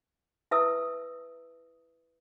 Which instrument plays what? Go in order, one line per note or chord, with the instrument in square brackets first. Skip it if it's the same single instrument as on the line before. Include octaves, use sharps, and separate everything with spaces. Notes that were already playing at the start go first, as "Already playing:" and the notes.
[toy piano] E4 B4 E5 A5 D#6 E6